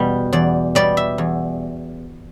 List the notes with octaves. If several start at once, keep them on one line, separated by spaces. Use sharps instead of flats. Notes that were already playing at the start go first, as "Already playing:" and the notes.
Already playing: E2 B2 G3
E2 D5
B2 G3 D5
E5
E2